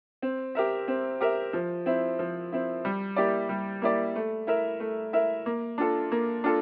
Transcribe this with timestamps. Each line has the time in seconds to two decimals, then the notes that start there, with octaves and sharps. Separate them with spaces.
0.22 C4
0.55 G4 A#4 E5
0.88 C4
1.21 G4 A#4 E5
1.53 F3
1.86 C4 E4
2.19 F3
2.52 C4 E4
2.85 G3
3.16 A#3 E4 G4 D5
3.49 G3
3.82 A#3 E4 G4 D5
4.15 A3
4.47 E4 A#4 E5
4.80 A3
5.13 E4 A#4 E5
5.46 A#3
5.78 D4 F4 A4
6.12 A#3
6.44 D4 F4 A4